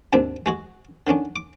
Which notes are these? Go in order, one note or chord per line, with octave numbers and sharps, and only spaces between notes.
D#2 G#2 D#3 C4 D4
G#3 F#4 G#4
D3 D#3 C#4 D4
D6